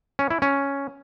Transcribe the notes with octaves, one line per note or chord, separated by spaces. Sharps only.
C#4
E4
C#4